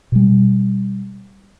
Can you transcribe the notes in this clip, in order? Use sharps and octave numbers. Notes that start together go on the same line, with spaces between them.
B2 G3